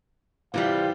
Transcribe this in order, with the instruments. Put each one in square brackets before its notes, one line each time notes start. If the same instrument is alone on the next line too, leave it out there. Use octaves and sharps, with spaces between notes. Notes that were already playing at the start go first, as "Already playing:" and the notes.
[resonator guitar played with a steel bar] C3 E3 G3 [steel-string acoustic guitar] E4 F4 C5 [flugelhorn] F5